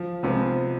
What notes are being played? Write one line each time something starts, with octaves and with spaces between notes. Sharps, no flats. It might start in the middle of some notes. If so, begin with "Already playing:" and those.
Already playing: F3
C3 F3 G#3 B3